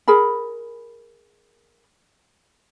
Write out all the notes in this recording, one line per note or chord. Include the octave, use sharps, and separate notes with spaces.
G#4 A#4 B5